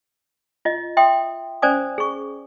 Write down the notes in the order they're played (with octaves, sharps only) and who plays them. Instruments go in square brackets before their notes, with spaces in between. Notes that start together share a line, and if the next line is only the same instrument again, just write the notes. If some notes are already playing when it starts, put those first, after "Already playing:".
[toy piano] F4 D#5
E5 G5 C6 D#6
C#4 C5 D5 G#5 D#6
G#4 C#6